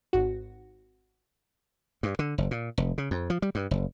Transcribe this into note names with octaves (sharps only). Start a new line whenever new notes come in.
G#1 F#4
G2
D3
F#1
A#2
F1
C#3
F2
F3
G3
G2
F#1